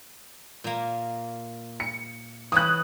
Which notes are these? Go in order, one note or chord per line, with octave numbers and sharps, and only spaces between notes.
A#2 A#3
C#7
E3 C#5 B5 D#6 F#6